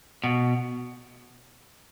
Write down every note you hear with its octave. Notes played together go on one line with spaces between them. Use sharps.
B2